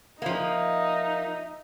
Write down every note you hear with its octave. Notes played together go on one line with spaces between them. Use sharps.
F3 A#3 D#4 E5